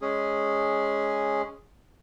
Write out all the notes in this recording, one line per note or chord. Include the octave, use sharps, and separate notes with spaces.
G#3 C#4 G#4